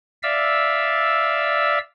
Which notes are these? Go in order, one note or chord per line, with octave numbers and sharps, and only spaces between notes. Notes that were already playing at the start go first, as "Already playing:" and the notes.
D5 E5 F5 E6